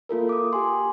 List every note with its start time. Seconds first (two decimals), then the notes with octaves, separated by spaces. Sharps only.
0.09 A#3 F4 A4 A#4
0.29 D6 D#6
0.53 G4 G#5 C6